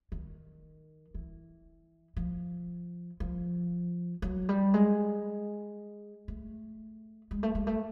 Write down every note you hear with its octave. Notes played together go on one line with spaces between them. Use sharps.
D#3
E3
F3
F3
F#3
G3
G#3
A3
G#3
A3
G#3
A3